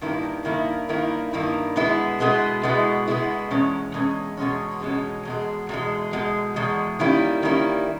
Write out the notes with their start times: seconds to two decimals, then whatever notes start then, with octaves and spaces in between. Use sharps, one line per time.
0.01 G2 D#3 A#3 E4
0.45 G2 D#3 A#3 E4
0.89 G2 D#3 A#3 E4
1.33 G2 D#3 A#3 E4
1.76 B2 G#3 B3 E4
2.20 B2 G#3 B3 E4
2.63 B2 G#3 B3 E4
3.07 B2 G#3 B3 E4
3.51 E2 B2 G#3 C#4
3.94 E2 B2 G#3 C#4
4.37 E2 B2 G#3 C#4
4.82 E2 B2 G#3 C#4
5.25 E2 B2 G#3
5.69 E2 B2 G#3
6.13 E2 B2 G#3
6.56 E2 B2 G#3
6.99 D#3 G3 A#3 C#4 E4
7.43 D#3 G3 A#3 C#4 E4